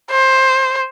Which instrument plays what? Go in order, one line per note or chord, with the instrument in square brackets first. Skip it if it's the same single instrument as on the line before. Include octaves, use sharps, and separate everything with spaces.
[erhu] C5